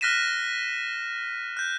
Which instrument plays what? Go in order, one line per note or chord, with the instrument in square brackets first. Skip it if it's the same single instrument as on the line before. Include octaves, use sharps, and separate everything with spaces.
[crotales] F6 F#6 A#6 B6 D#7 E7
F#6 G6